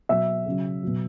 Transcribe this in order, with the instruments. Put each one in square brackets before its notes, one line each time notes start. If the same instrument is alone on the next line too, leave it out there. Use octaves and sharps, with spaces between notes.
[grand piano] B2 F#3 E5
C#3 F#3
B2 F#3